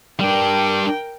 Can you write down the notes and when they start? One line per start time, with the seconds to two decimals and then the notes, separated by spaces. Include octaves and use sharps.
0.20 G3 D4 A#4 G5